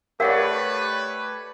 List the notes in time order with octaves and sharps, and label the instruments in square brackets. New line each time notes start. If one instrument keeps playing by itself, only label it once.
[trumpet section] A3 B4 [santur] G4 C#5 D5 [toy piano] A#4 F5 F#5